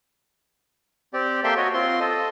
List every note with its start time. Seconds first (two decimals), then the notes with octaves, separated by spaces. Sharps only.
1.14 C4 G4 D5
1.44 A#3 G4 A4 E5 G5 C6
1.57 F#4 C#5 D#5
1.74 C4 F4 C6
2.00 A4 D#5